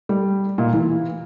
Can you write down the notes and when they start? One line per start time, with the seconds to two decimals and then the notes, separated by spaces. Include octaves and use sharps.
0.09 G3
0.58 A#2
0.73 E3